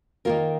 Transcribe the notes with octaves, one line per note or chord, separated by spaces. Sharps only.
D#3 A#3 F4 A#4